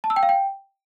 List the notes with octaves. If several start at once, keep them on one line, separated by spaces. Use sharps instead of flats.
A5
E6
G5
F5
G5